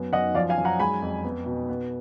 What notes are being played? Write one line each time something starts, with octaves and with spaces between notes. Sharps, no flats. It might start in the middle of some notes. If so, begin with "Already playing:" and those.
Already playing: F#2 B3
F#2 D#5 F#5
F3 D5 F5
F5 G#5
F#2
F#5 A#5
G#3 G#5 B5
F2
B3
B2
B3